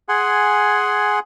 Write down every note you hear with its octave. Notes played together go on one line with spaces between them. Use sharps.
G#4 F#5 G#5 C6